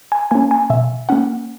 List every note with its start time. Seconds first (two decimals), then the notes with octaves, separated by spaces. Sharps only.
0.12 G#5
0.31 A#3 C#4 G#5
0.51 G#5
0.70 B2 E5
1.09 A#3 C#4 F#5